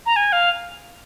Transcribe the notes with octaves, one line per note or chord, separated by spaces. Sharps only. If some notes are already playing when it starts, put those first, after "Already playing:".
A#5
G#5
F5